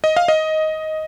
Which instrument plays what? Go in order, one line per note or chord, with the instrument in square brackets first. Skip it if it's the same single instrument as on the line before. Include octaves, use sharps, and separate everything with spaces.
[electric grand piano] D#5
F5
D#5